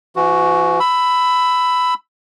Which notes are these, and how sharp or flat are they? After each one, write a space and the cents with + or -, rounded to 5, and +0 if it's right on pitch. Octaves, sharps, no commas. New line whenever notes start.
E3 +45 F#4 +0
B5 +15 E6 +0